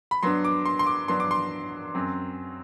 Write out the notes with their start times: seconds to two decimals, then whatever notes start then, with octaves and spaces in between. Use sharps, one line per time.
0.11 B5
0.22 G2 F#3 B3 D4 C6
0.44 D6
0.65 C6
0.79 C6
0.86 D6
1.08 G2 F#3 B3 D4 C6
1.20 D6
1.31 C6
1.95 F#2 F#3 C4